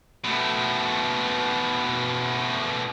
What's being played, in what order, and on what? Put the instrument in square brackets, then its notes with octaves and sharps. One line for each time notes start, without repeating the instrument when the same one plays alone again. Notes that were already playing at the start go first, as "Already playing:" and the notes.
[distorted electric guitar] B2 A3